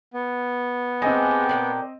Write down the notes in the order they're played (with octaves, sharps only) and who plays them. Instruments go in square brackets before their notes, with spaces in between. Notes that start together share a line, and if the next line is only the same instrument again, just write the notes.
[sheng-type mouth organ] B3
[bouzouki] G#3 [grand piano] C4 D#5 [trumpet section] D4 G4 G5
[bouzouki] A#2 G#3 D5